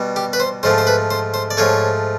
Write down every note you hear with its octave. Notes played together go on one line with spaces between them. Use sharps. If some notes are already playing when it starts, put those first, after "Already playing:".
Already playing: B2 G3
G4
B4
C5
G#2 F3 A3 C5
C5
B4
C5
C5
D5
G#2 F3 A3 C#5